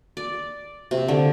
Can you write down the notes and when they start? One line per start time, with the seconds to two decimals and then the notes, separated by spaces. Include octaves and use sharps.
0.17 D5
0.91 C3
1.08 D3